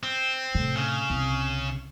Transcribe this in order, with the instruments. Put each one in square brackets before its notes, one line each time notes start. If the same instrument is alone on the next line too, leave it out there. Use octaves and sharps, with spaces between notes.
[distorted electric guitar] C4
[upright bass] A2 C3
[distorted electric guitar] C#3
[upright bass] C2